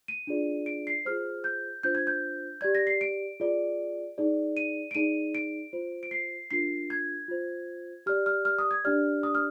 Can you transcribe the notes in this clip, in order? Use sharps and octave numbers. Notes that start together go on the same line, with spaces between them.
D#7
D4 F4 G#4 D5
D7
C7
F4 G#4 C5 F6
G6
D4 F4 C5 G6
G#6
G6
G4 D5 G#6
A#6
C7
D7
F4 G#4 D5
D#4 G#4 D5
D#7
D7
D#4 G#4 D5 D#7
D7
F4 C5
D7
C7
D4 F4 A#4 C7
G#6
F4 C5
G4 D5 F6
F6
F6
D#6
G#6
D4 G4 D5 F6
D#6
F6